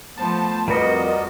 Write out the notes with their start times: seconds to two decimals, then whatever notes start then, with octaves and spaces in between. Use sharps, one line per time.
0.17 F3 A3 B3 C5 A5
0.68 F2 G3 F#4 A#4 B4 D5 D#5